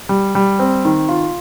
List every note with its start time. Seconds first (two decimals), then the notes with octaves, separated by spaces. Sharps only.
0.09 G3
0.35 G3
0.59 C4
0.85 D#3
1.09 F4